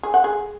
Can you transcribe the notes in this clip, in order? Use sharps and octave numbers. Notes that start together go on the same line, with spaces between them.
G#4
F#5
G#4